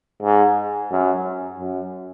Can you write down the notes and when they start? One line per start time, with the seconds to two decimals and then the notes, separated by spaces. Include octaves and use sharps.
0.23 G#2
0.91 F#2
1.60 F#2